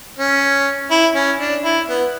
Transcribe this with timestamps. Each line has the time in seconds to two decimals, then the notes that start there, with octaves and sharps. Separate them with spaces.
0.19 C#4
0.91 E4
1.15 C#4
1.39 D4
1.64 E4
1.88 B3